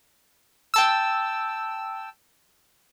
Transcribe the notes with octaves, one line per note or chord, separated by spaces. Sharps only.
G5 A5 E6